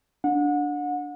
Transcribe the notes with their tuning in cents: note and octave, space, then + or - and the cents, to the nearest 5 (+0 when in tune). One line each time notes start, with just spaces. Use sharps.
D4 +0 F#5 -30